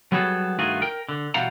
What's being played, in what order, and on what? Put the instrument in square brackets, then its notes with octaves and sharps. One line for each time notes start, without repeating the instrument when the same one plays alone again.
[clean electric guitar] F#3 G3 B3 F#4 G#4 A4
G2 D#3 A3 F4 F#4 G#4
A#4 G5
D3
B2 E3 G3 F5 F#5 A#5